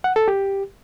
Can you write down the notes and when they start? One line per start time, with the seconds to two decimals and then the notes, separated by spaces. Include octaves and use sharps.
0.04 F#5
0.16 A4
0.28 G4